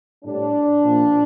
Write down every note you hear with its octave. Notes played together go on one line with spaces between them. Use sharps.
A2 G3 D4
A#2 F3